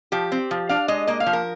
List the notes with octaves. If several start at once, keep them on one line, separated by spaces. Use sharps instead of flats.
F3 G4
C4
F3
D4 F5
G#3 D#5
A#3 D#5
F5
F3
A#4